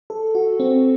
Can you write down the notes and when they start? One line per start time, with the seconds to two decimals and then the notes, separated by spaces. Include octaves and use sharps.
0.10 A4
0.35 F#4
0.60 C4